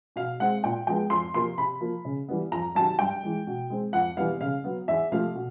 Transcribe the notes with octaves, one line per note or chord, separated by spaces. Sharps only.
B2 F5
G#3 C4 F#5
A#2 G5
F3 G#3 B3 G5
F2 C6
C3 F3 A#3 C6
C3 B5
F3 A#3
C#3
E3 G3 B3
F2 A#5
C3 D#3 F#3 A5
G2 G5
E3 G#3
B2
G#3 C4
F2 F#5
C3 E3 G3 B3 F5
C#3 F5
F#3 B3
E2 E5
C3 F3 A3 F5
B2